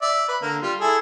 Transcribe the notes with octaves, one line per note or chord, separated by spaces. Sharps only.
D5 E5
B4
D3 A#3
G3 F4
E4 G#4 A4